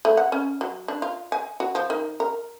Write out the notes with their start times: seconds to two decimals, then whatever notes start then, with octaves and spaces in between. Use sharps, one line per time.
0.05 A3
0.17 F#5
0.32 C#4
0.61 F#3
0.88 D4
1.02 F4
1.32 G#5
1.60 F#4
1.75 F3
1.90 D#3
2.20 A#4